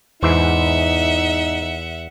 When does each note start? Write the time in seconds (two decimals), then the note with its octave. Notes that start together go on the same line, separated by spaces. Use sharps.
0.23 E2 G#2 E3 D#4 C5 E5 F#5